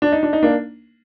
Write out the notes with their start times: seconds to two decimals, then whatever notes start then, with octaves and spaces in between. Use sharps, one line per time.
0.02 D4
0.12 D#4
0.23 D4
0.33 D#4
0.43 A#3 D4